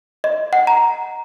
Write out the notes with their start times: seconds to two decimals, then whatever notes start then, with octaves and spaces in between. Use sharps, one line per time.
0.24 D#5
0.53 F#5
0.67 A#5